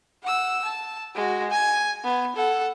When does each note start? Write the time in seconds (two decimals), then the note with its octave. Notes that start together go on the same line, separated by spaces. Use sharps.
0.23 F#5 E6
0.65 A5
1.15 G#3 F#4
1.51 G#5
2.04 B3
2.36 A4 F#5